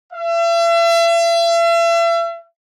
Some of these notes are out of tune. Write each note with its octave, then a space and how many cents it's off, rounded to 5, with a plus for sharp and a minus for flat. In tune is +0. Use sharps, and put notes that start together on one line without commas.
E5 +40